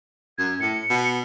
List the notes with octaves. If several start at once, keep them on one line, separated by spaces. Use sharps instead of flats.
F#2 G#6
A2 C#7
B2